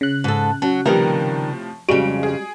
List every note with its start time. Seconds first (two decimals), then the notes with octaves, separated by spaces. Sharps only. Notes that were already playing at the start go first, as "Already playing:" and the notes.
0.01 C#3 F#6
0.24 G#2 A4
0.62 F#3 C#4
0.85 A2 C3 D#3 F3 G3 G4 A#4 B4
1.89 F2 C#3 G3 G#3 F#4 D7
2.23 G#4